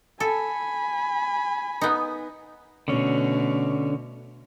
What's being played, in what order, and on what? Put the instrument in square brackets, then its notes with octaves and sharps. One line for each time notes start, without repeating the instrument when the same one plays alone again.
[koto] A4 [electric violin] G#5 B5
[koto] B3 D#4
[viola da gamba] B2 A3 [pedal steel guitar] D3 C#4